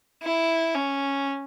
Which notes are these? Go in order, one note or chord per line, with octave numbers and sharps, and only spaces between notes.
E4
C#4